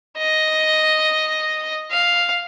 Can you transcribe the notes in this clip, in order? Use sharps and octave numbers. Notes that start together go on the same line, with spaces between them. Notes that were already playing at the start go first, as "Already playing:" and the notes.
D#5
F5